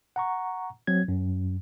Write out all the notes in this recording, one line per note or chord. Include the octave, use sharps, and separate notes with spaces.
F#5 A#5 C#6
F#3 C4 G#6
F#2